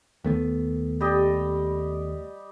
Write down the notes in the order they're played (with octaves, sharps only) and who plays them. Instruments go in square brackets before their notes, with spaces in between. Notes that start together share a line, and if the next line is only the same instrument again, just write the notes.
[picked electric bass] D#2 A3 B3
[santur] G3 G4 D#5